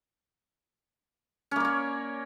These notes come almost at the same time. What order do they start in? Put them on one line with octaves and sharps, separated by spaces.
C#4 A#3 D5 C#5